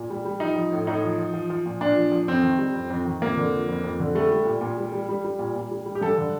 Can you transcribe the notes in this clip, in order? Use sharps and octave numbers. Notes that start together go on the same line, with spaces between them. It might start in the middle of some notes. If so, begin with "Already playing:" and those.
Already playing: A#2
G3
G3
F3 D#4
F3
A2
A2 D#4
F3
F3
F3
F3
A#2
A#2 D4
F3
F3
F2 C4
D#3
G3
F2
F2
D#3
F2 A#3
D3
F3
F2
F2
D3
G3 A3
G3
A#2
A#2
G3
G3
G3
G3
A#2
A#2
G3
G3
G4
G2 A4
D3